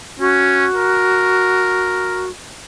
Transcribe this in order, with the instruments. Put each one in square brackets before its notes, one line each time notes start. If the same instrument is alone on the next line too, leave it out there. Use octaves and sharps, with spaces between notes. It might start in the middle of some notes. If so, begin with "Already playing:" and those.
[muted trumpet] C#4 [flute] F#4
[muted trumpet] A#4